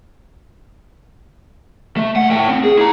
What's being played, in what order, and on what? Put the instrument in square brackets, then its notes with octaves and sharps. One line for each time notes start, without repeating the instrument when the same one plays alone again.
[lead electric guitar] A3
B1 F#5
A2 G5
C4
G#4
E4 A#5